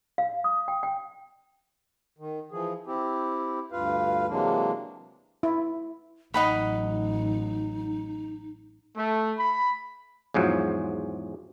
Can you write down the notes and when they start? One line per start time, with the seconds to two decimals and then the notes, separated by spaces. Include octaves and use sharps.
0.18 F5
0.44 D#6
0.68 G5
0.83 G5
2.18 D#3
2.52 E3 F3 G#4
2.87 C4 E4 G4
3.72 D2 G2 F4 B4 F5
4.29 C3 E3 F#3 G#3 A#3 D4
5.43 E4
6.34 A1 F#3 D#4 D#5 F#5 B5
8.96 A3
9.37 B5
10.34 E2 G#2 F3 F#3